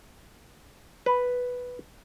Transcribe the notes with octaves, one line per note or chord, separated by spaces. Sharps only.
B4